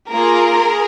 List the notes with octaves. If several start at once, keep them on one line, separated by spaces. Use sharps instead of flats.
A#3 F4 G#4 A#4
G#4